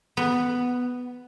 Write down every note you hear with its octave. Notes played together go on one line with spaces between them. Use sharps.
B3